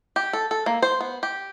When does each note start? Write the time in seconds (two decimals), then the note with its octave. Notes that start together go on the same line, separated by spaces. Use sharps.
0.16 G4
0.33 A4
0.51 A4
0.66 A#3
0.82 C5
1.01 B3
1.23 G4